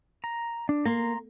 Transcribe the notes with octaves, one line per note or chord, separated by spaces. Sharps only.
A#5
D4
A#3 A#5 C6